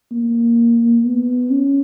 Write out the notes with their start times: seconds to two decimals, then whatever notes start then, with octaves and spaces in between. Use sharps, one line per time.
0.11 A#3
1.05 B3
1.51 C#4